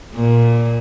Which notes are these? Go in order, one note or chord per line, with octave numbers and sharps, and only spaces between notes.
A#2